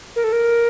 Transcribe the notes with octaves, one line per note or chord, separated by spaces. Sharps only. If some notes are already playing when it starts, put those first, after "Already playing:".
A#4
A4
A#4